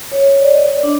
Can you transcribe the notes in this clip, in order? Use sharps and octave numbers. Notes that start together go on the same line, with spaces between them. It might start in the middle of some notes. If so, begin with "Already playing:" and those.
C#5
D5
D#5
D4